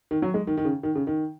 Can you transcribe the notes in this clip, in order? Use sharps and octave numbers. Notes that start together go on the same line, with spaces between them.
D#3
F#3
G#3
D#3
D#3
C#3
D#3
C#3
D#3